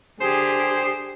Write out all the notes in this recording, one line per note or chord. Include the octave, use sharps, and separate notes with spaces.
D3 G4 G#4 C5